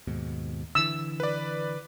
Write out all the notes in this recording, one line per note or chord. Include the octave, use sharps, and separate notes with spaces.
D#2 G#2 B2
D3 E3 E6
B4 D5